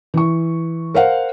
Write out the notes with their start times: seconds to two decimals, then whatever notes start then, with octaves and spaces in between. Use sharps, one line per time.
0.14 E3 C#6
0.94 A#4 C5 F5 F#5